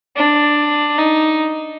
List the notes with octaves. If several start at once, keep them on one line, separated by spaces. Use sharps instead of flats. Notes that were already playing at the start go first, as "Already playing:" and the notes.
D4
D#4